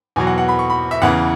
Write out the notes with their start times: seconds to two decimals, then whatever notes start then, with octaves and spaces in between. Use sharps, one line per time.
0.16 E2 B2 F#3 G#5
0.27 F#5
0.38 F#5
0.48 B5
0.59 C#6
0.70 B5
0.91 E5
1.02 E2 C#3 E3 F#5